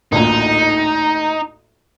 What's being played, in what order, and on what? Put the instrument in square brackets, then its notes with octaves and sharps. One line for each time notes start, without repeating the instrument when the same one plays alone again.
[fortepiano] A1 D2 A#2 [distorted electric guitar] D#4